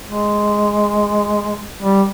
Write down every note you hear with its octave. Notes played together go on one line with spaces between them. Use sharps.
G#3
G3